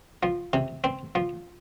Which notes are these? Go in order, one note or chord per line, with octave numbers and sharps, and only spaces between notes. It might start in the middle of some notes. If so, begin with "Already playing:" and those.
F3
C3
C4
F3